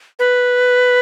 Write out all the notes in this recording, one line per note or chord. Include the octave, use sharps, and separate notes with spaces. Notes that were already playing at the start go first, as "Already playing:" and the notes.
B4